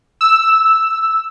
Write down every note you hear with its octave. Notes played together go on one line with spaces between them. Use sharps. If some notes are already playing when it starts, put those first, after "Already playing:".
E6